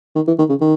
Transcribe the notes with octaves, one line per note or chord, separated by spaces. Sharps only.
D#3
E3
D#3
C#3
D#3